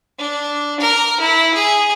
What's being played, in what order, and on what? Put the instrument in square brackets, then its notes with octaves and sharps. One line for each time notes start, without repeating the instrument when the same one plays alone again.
[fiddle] D4
A#4
E4
G#4